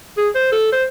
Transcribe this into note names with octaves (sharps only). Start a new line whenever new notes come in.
G#4
C5
A4
C5